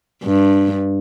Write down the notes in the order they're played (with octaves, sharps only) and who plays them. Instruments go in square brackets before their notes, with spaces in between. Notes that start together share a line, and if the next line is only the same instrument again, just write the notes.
[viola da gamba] G2